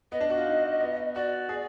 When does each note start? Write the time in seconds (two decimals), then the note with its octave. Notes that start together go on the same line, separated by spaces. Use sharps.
0.12 B3 D#5
0.21 D4
0.30 F#4
0.37 F4
0.46 D#4
0.80 B3
1.15 F#4 D5
1.49 G#4